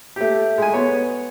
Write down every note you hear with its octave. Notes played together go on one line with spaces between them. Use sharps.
A3 G4
G#3 G#5
B3 C#5